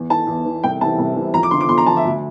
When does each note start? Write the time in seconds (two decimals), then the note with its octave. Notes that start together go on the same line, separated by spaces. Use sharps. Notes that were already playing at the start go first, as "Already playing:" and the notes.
Already playing: E2
0.09 E3 A5
0.27 E2
0.45 E3
0.63 C2 G5
0.81 C3 E3 A5
0.98 C2
1.16 C3 E3
1.34 F2 A#5
1.43 D6
1.51 D3 F3 C6
1.61 D6
1.69 F2 C6
1.78 A#5
1.86 F3 A5
1.91 D3
1.97 E5
2.05 D2